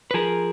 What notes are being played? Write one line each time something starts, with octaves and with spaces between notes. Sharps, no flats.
B4
F3 G#4 A#4